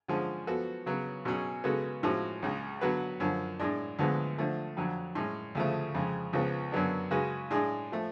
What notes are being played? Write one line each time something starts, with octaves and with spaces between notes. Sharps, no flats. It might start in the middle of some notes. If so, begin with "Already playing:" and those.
D3 F3 G#3 C#4
F3 B3 F#4 A4
C#3 F#3 B3
B2 F#3 C#4 G#4
C#3 G#3 B3 F#4 A4
A2 F3 G#3 C#4 F#4
C#2 C#3 G#3
D3 F#3 B3 F#4 B4
F#2 D3 F3
A2 G#3 D4
D2 D3 F3 G#3 B3
D3 F3 A3
F2 D3 F#3
A2 G#3 C#4
D2 C#3 F3 A3
F2 C#3 G#3
C#2 C#3 F3 B3
F#2 D3 F#3 B3 D4
C#3 G#3 C#4 F#4 B4
A2 G#3 D4 G#4
F3 A3